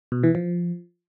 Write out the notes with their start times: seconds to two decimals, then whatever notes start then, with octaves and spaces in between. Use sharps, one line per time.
0.12 B2
0.23 E3
0.35 F3